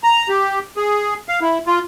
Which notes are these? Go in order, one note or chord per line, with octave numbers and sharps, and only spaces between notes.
A#5
G4
G#4
F5
E4
F4